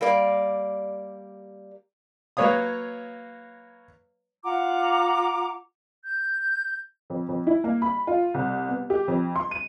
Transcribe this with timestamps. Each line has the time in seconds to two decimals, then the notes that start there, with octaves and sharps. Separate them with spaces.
0.01 G3 A#3 D5
2.37 F#3 A#3 B4 C#5 F5 D#6
4.44 F4 F#5 A#5 D6
6.04 G6
7.10 F2
7.29 F2
7.47 E4
7.64 A#3
7.82 B5
8.07 F4
8.34 C2
8.69 B3
8.90 G4
9.08 F2
9.36 C6
9.51 D#7